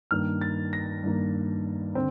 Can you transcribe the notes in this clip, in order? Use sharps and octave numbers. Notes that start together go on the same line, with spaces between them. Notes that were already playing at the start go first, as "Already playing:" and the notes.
G2 D#3 A#3 F6
A6
A#6
G2 D#3 A#3
D3 C4